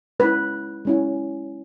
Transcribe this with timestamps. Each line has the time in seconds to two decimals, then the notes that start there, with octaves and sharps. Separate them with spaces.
0.20 G#3 C#4 E4 B4
0.85 G#3 C#4 E4